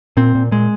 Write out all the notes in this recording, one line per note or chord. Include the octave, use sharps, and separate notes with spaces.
A#2 C4
A#2
A#2 G#3